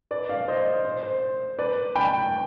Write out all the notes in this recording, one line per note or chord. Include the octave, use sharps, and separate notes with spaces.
B4 D5
D5 F5
C5 D#5
C5
C5
B4 D5
G5 B5